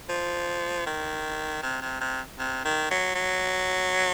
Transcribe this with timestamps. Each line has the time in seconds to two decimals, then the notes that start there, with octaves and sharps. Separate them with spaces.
0.09 F3
0.86 D#3
1.63 C3
1.82 C3
2.01 C3
2.38 C3
2.65 D#3
2.91 F#3
3.15 F#3